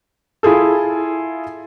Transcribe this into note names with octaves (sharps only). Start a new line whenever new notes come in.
E4 F4 G#4 A4